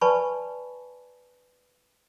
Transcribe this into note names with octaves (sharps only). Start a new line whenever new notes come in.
B4 D5 G#5 A5 B5 C#6